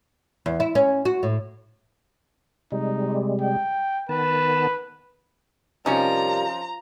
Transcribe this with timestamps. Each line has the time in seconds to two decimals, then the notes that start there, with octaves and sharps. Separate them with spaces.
0.46 E2
0.60 E4
0.75 C#4
1.05 F#4
1.23 A2
2.72 C3 G3 G#3 D#4
3.41 G5
4.09 D#3 B3 B4 A5
5.86 C3 F3 G3 C#4 D#4 A#4 A#5